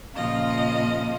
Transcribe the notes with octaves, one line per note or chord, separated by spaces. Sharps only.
A#2 C#3 F3 F4 D#5